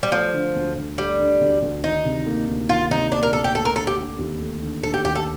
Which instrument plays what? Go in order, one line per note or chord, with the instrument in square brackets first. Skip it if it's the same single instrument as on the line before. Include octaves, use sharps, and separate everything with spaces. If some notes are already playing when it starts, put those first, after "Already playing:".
[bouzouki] G3
[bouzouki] F3 [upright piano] A3
[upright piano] D3
D2
D2
[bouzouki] G3 [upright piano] A3
[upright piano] D3
D2
D2
[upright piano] D#3 [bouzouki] D#4
[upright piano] C3
A#3
D2
[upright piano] D#3 [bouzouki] F4
[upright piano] C3 [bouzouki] D#4
[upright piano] A#3 [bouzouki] D4
[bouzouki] A#4
[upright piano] D2 [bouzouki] A4
[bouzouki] G4
[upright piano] A3 [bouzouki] A4
[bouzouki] A#4
[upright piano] D3 [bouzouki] A4
[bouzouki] G4
[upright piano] D4
D#2
A3
D3
[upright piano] D4 [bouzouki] A4
[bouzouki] G4
[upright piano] D#2 [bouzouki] G4
[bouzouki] A4